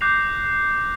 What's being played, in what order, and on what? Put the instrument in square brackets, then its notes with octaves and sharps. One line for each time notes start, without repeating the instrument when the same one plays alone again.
[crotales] D6 F#6 G6 A#6 C7 F7